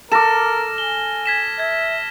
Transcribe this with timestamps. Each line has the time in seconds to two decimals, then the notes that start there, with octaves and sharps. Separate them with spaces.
0.12 A4 A#4 D6 F6 A#6 E7
0.78 G#5 G7
1.26 G#6 B6 E7
1.59 E5 G#6